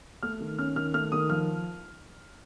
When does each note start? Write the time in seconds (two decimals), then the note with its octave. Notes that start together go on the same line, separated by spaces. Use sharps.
0.23 A3 F6
0.40 D#3
0.59 C#4 F6
0.76 D#3 F6
0.94 A3 F6
1.12 D#3 D#6
1.30 F3 F6